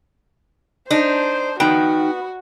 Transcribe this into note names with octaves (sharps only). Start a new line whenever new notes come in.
D4 D#4 C5
B3 D#4 F#4 G5